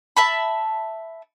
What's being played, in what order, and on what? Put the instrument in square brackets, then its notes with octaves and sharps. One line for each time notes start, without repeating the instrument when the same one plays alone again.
[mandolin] E5 A5 B5